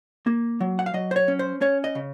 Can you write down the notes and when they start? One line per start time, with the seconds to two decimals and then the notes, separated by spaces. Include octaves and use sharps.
0.27 A#3
0.61 F#3
0.79 F#5
0.86 F5
0.94 F#3 D#5
1.11 C5
1.16 C#5
1.28 C#4
1.39 C5
1.61 C#4 C#5
1.84 D#5
1.95 C#3